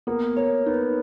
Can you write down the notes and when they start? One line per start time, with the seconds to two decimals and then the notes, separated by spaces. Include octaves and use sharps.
0.07 A#3 B3
0.37 A#3 C#5
0.66 B3 D#4